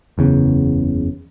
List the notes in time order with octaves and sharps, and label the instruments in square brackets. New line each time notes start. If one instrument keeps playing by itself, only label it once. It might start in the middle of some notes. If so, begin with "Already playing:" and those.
[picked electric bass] F#1 E2 C#3